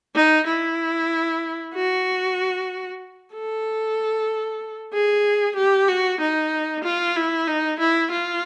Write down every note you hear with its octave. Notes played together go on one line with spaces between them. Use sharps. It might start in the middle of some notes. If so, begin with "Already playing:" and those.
D#4
E4
F#4
A4
G#4
G4
F#4
D#4
F4
E4
D#4
E4
F4